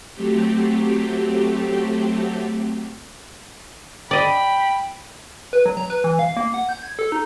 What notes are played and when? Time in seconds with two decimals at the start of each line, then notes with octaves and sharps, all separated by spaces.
0.14 F#3 A3 C4 G4
4.11 D5 D#5 G5 B5
5.53 B4
5.66 F#3
5.77 A#5
5.90 B4
6.04 E3
6.19 F5
6.37 A#3
6.54 F#5
6.69 G6
6.83 G#6
6.99 A4
7.12 D#4